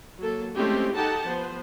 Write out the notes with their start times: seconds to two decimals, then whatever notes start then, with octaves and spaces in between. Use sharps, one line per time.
0.19 F#3 A#3 A4
0.55 G#3 A3 C4 C#4 E4 G4
0.95 D#4 G4 A4 F#5 A5
1.25 F3 B3 C5